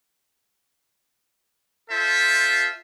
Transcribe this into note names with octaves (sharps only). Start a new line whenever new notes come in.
F4 A4 C5 E5